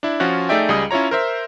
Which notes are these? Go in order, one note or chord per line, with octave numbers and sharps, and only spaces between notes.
D4 E4
F3 C#4 F4 F#4 F#6
A3 D#4 G#4 D5 E5 G5
C#2 G3 G#4 D#5 D#6
C#4 E4 F4 C#5 A#5
A#4 C5 E5